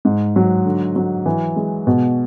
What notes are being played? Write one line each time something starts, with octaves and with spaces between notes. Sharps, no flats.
G#2
F#3
D3
F#3
E3
G#3
B2